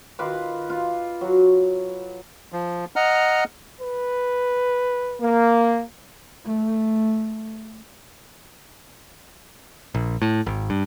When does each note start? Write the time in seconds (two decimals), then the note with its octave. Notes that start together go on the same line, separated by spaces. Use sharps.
0.19 D#3 F4 B4 D6
0.70 F4
1.21 F#3
2.52 F3
2.96 D#5 F#5 A#5 F6
3.81 B4
5.22 A#3
6.45 A3
9.94 A#1
10.22 A2
10.46 G#1
10.70 G2